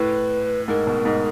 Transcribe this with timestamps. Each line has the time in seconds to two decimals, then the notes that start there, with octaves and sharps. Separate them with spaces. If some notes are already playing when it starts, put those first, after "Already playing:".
Already playing: A2 B4
0.68 G#2 A#4
0.87 B2
1.05 G#2